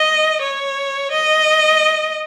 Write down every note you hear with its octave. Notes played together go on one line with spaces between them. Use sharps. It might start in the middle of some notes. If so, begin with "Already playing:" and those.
Already playing: D#5
C#5
D#5